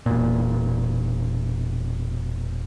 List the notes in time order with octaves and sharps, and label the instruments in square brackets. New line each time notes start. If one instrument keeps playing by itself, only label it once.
[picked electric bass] E1 A#2